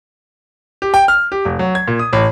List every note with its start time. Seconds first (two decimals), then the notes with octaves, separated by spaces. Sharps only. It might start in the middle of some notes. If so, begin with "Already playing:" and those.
0.82 G4
0.94 G5
1.08 F6
1.32 G4
1.45 F1
1.59 F#3
1.75 G#6
1.88 A#2
1.99 D#6
2.13 A1